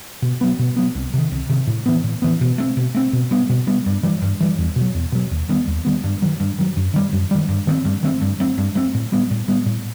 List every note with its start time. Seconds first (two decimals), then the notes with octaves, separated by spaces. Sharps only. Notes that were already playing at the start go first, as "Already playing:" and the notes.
0.22 B2
0.41 F#3 B3
0.59 B2
0.77 F#3 B3
0.95 C2
1.14 C3 D#3
1.31 C2
1.49 C3 D#3
1.67 A2
1.86 E3 B3
2.04 A2
2.22 E3 B3
2.41 B2
2.58 A3 C4
2.77 B2
2.95 A3 C4
3.13 B2
3.31 G3 B3
3.49 B2
3.67 G3 B3
3.86 G2
4.03 E3 G3
4.22 G2
4.40 E3 G3
4.58 E2
4.76 B2
4.81 F#3
4.94 E2
5.12 B2 F#3
5.31 D#2
5.49 D#3 G3 B3
5.67 D#2
5.85 D#3 G3 B3
6.04 G2
6.22 D#3 F#3
6.40 G2
6.59 D#3 F#3
6.77 F#2
6.94 D#3 G3
7.13 F#2
7.31 D#3 G3
7.49 G2
7.67 D#3 A3 C4
7.85 G2
8.03 D#3 A3 C4
8.21 G2
8.40 F#3 A3 C4
8.58 G2
8.75 F#3 A3 C4
8.94 A2
9.12 G3 B3
9.31 A2
9.48 G3 B3
9.66 A2